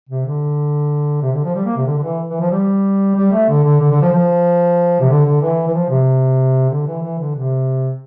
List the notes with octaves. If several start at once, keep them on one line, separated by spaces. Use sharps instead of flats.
C3
D3
C3
D3
F3
G3
A#3
C3
D3
D3
E3
E3
F3
G3
G3
A3
D3
D3
D3
D3
F3
F3
C3
D3
D3
E3
E3
F3
C3
D3
E3
E3
D3
C3